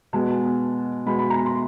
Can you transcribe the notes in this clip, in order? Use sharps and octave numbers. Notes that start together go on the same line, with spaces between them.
B2 G#3 B3 A5
B2 G#3 B3 B5
B5
A#5
C6